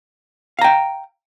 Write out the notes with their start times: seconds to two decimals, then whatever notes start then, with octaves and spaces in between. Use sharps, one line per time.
0.59 F5
0.61 A#5
0.64 G5